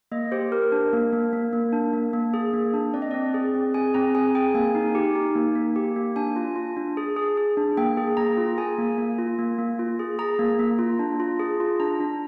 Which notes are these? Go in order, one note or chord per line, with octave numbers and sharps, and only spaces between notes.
A#3 D#5
G4 C5
G4 A#4
D4
A#3
A#3
A#3
A#3
D4
A#3
A#3
G#4
A#3
D4
C4 D5
D#5
C4 D5
G#4
C4
G#4 G#5
C4 A#5
G#4 G#5
G#4 G5
A#3 G#5
D#4
G4
D#4
A#3
A#3
G4
A#3
D4 G#5
F4
F4
D4
G#4
G#4
G#4
D4
A#3 G5
G#4
A#3 A#5
F4
G#4 G#5
A#3
A#3
F4
A#3
A#3
F4
G#4
G#4 A#5
A#3
A#3
F4
D4
F4
G#4
F4
D4 A#5
D4